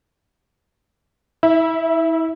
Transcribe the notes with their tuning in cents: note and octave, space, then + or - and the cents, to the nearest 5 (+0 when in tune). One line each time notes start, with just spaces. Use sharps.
E4 -30 E5 +5